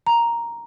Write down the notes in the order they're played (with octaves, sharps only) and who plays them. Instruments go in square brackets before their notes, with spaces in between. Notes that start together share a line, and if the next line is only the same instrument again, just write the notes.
[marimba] A#5